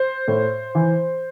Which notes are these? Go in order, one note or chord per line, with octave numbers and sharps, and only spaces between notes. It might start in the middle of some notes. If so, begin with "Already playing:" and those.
Already playing: C5
A2
E3